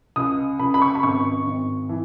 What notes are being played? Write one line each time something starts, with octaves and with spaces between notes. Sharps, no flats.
C#2 D#6
C#2 B5
B5
C#6
B5
G#1 C#6
G#1
E3